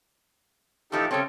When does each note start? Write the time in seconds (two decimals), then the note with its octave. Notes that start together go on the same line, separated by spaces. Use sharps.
0.92 A2 E3 F3 D#4 G4 A4
1.11 C#3 G3 C4 A4 C#5